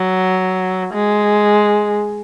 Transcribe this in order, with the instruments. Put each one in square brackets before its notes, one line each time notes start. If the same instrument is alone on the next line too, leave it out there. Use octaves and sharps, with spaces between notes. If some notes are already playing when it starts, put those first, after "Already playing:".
Already playing: [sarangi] F#3
G#3